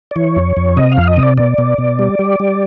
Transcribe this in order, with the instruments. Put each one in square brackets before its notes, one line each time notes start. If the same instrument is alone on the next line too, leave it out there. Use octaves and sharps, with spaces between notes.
[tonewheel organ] D5
E3 C#5
F2
F2
C3 D#5
F5
F2
D#5
C3
D5
B2 D5
B2
B2
G3
G3
G3